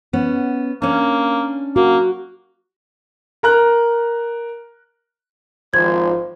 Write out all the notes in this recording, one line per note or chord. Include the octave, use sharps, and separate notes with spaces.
B3 C#4
A#3 C#4 D4
A#3 F#4
A#4 A#5 F#6
G#1 F3 C5 G#6